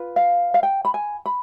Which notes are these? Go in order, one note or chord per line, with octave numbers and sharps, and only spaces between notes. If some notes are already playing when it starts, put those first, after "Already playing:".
Already playing: F4 B4
F5
F5
G5
B5
G#5
B5